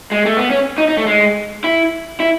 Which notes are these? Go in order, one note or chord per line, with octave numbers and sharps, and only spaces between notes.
G#3
A3
B3
C#4
D#4
D#4
A3
G#3
E4
E4